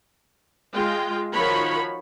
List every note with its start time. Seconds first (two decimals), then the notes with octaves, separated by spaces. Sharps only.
0.73 G#3 F4 G5
1.33 D#3 F3 F#4 C#5 B5